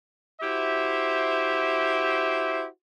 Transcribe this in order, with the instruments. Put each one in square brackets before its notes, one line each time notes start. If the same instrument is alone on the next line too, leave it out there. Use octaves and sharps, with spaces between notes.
[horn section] E4 F#4 G4 C5 E5